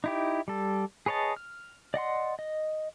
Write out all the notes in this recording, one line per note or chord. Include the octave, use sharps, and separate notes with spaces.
D#4 E4 G4
G3 A4
G#4 B4 C#5 D#5 A5
F6
D5 D#5 F#5 C6
D#5